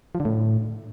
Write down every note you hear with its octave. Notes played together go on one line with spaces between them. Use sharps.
F3
D3
A2